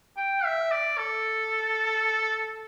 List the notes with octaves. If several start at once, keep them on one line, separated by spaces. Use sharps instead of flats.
G5
E5
D5
A4